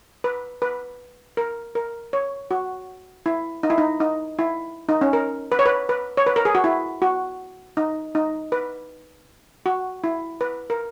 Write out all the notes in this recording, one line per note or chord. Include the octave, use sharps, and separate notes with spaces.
B4
B4
A#4
A#4
C#5
F#4
E4
D#4
E4
D#4
D#4
E4
D#4
C#4
A#4
B4
C#5
B4
B4
C#5
B4
A#4
G#4
F#4
E4
F#4
D#4
D#4
B4
F#4
E4
B4
A#4